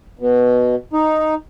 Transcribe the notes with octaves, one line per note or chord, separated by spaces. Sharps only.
B2
D#4